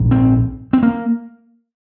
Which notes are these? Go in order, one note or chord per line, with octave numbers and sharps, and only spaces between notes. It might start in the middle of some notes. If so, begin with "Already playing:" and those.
Already playing: A#1 G#2
C4
C4
A#3